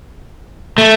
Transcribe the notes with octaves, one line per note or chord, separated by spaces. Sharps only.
A3